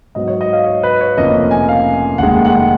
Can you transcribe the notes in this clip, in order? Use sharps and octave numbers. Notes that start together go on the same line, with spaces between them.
G#2 F#3 B3 D#5
C#5
D#5
F5
C#5
B4
C#5
F1 F2 C#3 F3 A#3 D#5
G#5
F5
F1 D#2 D#3 G#3 F#5
F#5